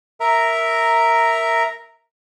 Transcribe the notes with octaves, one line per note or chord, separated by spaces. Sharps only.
A#4 E5 A#5